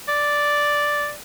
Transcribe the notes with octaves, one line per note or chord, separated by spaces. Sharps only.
D5